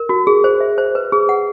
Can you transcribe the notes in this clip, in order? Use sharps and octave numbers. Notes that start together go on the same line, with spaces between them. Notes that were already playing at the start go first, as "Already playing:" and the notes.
Already playing: A#4
F#4
G#4
C5
E5
C5
B4
G#4
F#5